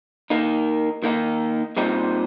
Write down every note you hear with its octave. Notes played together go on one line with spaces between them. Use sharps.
D#3 A#3 D#4
D#3 A#3 D#4
A#2 G3 C4 D#4